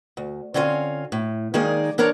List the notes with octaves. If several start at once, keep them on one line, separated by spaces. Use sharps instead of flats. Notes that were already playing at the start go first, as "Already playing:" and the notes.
D2
D3 C4 C#4 F4 D#5 G#5
A2
D#3 G#3 A#3 D#4 G#4 D5
E3 D4 A#4 C#5 D5 A#5